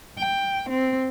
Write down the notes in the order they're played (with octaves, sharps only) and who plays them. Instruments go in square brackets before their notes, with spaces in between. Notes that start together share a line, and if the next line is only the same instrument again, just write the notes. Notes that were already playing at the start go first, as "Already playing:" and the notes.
[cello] G5
C4